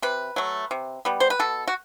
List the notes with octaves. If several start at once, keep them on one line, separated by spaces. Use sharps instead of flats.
C3 B4
F#3 A3
C3
G3 B3
C5
B4
B2 A4
F#4